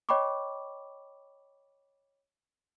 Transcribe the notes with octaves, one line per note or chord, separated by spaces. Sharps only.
C#5 D#5 G5 B5 C#6 D6